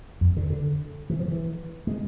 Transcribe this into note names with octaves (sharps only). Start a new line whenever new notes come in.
F2
D3
D3
E3
F3
E3
G#3